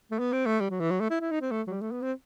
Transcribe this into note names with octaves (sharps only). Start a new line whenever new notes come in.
A3
B3
C4
A3
G3
F#3
E3
F#3
A3
E4
E4
D#4
C4
A3
F#3
G3
A3
B3
C4